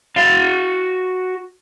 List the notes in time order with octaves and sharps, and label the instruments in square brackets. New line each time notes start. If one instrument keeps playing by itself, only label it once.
[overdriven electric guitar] F#4 F5